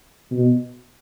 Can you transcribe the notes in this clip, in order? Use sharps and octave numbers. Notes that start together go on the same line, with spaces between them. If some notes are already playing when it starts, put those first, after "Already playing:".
B2